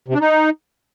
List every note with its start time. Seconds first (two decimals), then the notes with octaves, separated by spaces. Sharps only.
0.08 C3
0.14 D4
0.20 D#4